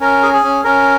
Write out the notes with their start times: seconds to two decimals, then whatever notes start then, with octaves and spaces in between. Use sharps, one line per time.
0.01 C#4 A#4
0.23 G#4
0.33 G#4
0.43 C#4
0.64 C#4 A#4